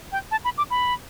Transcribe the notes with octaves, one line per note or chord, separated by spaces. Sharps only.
G5
A5
B5
D6
B5